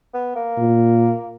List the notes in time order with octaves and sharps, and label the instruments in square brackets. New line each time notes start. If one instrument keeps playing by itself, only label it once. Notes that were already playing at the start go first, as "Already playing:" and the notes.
[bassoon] B3
A#3
[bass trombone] A#2